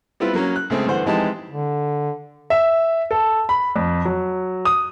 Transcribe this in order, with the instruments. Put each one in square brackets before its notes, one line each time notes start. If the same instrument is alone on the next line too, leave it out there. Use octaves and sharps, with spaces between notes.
[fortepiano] G3 B3 C4 E4 F4 B4
F#3 A#3 C#4
F#6
C#2 A3 C4 G#4
G2 D3 E3 C5 F#5
F2 E3 G#3 D#4 G4 A5
[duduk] D3
[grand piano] E5
A4
B5
F2
F#3
D#6